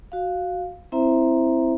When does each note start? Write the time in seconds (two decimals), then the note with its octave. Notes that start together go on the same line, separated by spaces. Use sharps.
0.12 F#4 F5
0.92 C4 E4 C5 E5 A#5